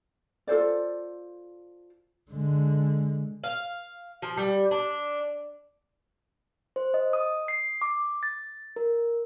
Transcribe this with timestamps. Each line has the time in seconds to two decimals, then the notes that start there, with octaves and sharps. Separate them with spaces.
0.47 F4 A4 C5 D5
2.31 D3 G#3
3.44 F5
4.22 F3
4.37 G3
4.71 D4
6.76 C5
6.94 D#5
7.13 D#6
7.48 C7
7.82 D6
8.23 A6
8.76 A#4